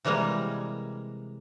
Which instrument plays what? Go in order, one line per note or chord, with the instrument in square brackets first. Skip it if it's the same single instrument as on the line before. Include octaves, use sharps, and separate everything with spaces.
[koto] C3 E3 G3 G#3 A#3 A#4